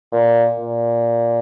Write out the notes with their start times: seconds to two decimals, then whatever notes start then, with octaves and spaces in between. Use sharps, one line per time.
0.12 A#2
0.58 A#2